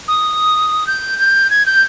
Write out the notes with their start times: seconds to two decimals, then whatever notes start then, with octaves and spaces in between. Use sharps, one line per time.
0.08 D#6
0.87 G6
1.19 G6
1.50 G#6
1.66 G6